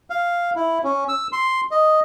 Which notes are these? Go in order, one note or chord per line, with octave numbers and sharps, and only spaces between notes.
F5
E4
C#4
E6
C6
D#5